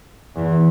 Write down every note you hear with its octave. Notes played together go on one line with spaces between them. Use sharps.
E2